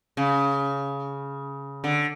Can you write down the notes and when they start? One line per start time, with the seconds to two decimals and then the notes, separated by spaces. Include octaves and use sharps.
0.17 C#3
1.84 D3